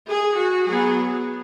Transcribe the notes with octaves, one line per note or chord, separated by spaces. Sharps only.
G#4
F#4
F#3 B3 G#4